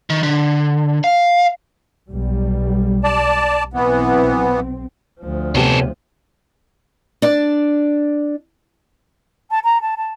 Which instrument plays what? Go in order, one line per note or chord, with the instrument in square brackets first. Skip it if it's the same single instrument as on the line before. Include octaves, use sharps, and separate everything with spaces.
[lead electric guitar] D#3
D3
F5
[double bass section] B1 G3
[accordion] D5 A5
[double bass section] B1 C4 [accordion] E3 B3
[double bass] D2 F3
[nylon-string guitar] C3 B3 G4 [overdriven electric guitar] C#4 A4
[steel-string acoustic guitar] D4 D5
[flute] A5
A#5
A5
A5